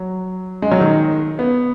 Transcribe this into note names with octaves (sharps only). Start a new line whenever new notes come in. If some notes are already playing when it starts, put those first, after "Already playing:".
Already playing: F#3
G#3
F#3
D#3
B3